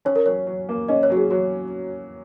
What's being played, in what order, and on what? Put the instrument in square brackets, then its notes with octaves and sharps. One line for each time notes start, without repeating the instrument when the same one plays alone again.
[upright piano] C#4 [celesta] C#5
[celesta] A#4
[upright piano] F#3 [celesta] C#5
[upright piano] F#3
A#3
[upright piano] C#4 [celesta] D#5
[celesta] C#5
[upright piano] F#3 [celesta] F#4
[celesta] G#4
[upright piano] F#3 [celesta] F#4